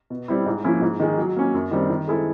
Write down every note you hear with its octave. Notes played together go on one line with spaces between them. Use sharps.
B2
G3 C4 E4
G#2
F3 A#3 C#4 E4
G#2
D#3 G#3
F#3
A#3 C#4
F#2
D#3 G3 C4
D#3
G#3 C4 E4 A4